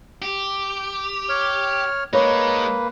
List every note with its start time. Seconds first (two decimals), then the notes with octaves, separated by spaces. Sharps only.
0.22 G4
1.29 C#5 F6
2.13 G#3 A#3 D#4 B4 C#5